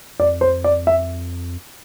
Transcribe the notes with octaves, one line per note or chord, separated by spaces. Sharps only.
F2 D5
C5
D5
E5